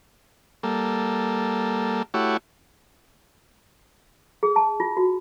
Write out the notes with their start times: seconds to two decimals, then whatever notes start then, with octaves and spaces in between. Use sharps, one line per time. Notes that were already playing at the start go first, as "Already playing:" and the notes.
0.63 G3 A#3 A4
2.14 A3 E4 F#4 G4 C#5
4.43 G#4
4.56 A5
4.80 F4
4.97 F#4